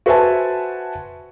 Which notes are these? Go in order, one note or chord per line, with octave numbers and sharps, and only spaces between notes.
F#4 B4 C5 E5 G#5 A5